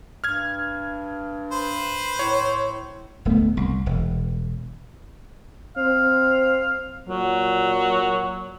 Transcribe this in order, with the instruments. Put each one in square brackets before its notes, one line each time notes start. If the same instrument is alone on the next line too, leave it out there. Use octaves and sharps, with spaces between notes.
[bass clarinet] G2 [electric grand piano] F6 G#6
[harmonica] B4 C5
[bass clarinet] A2 [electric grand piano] C#5
[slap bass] D1 A3 B3
C2
E1
[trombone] C4 [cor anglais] F5
[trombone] A#2 [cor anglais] F#3